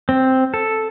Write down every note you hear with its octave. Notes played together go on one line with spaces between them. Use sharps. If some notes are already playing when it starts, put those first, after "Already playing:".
C4
A4